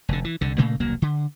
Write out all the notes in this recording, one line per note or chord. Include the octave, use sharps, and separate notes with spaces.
F1 D3
E3
C2 D3
A#2 C#3 A3 A#3
E1 C2 F#3 A#3
D3